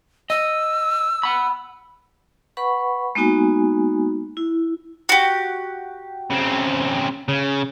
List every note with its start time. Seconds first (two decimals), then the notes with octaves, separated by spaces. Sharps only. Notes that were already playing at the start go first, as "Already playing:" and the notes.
0.30 D#5 E6
1.23 F#5 B5
2.57 B4 F#5 B5 C#6
3.15 G#3 A#3 B3 D#4 F#4 G#5
4.37 E4
5.09 F#4 G4
6.31 C#3 C4
7.29 C#3